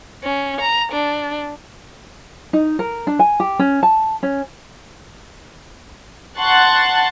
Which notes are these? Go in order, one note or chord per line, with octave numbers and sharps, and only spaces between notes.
C#4
A#5
D4
D#4
A#4
D4
G#5
G4
C#4
A5
C#4
F#5 A5 C6 C#6 F#6 A6